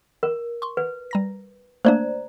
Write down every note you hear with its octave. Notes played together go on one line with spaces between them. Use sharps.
A#4
C6 C#6
B4
G3 A#5 A#6
A3 A#3 D4 C5 D5 A#5